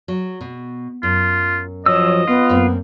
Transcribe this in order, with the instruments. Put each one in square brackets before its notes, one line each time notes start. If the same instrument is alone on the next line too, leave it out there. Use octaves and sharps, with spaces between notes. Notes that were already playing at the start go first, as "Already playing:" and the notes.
[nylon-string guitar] F#3
B2
[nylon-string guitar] F#2 [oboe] F4
[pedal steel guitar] F3 F#3 E6 [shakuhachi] C#5 [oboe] D#5
[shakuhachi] B3 [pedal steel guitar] F4
[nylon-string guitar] F#2 A#3 C4